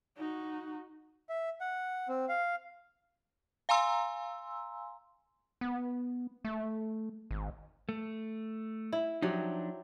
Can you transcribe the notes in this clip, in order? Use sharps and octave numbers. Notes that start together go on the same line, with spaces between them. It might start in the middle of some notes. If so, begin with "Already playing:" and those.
D#4 F#4
E5
F#5
C4
F5
F5 G#5 A#5 C6 E6
B3
A3
G#1
A3
E4
F3 F#3 D4 D#4 G4